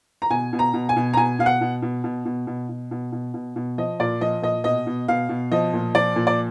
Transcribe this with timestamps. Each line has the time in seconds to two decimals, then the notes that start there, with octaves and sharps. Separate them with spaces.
0.22 A#5
0.30 B2 G#5
0.53 B2
0.59 A#5
0.74 B2
0.89 G#5
0.96 B2
1.14 A#5
1.17 B2 G#5
1.39 B2 F5
1.46 F#5
1.61 B2
1.82 B2
2.04 B2
2.25 B2
2.47 B2
2.69 B2
2.91 B2
3.12 B2
3.34 B2
3.56 B2
3.78 F3 D#5
4.00 A#2 D5
4.21 F3 D#5
4.42 A#2 D#5
4.64 B2 D#5
4.87 B2
5.08 B2 F5
5.29 B2
5.52 F3 D#5
5.73 A#2
5.95 F3 D5
6.16 A#2
6.27 D5